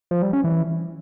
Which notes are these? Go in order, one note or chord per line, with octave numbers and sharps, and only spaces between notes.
F3
G3
C#4
E3